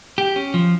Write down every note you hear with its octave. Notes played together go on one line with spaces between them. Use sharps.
G4
C#4
F3